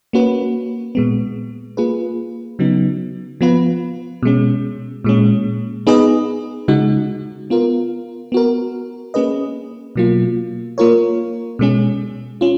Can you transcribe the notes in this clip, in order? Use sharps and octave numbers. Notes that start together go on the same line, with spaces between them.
A#3 C#4 F#4 B4
A#2 G#3 B3
A#3 F4 G#4 B4
C#3 F#3 B3 D#4
F3 B3 F4 B4
B2 G#3 C#4
A#2 G#3 C#4
B3 D#4 G#4 B4 D#5
C#3 G#3 D#4 F#4
B3 F4 A#4
B3 F#4 A#4
A#3 C#4 G#4 B4 D#5
B2 F#3 A#3 F4
A#3 F4 A#4 C#5
B2 G#3 C#4 G#4
C#4 F4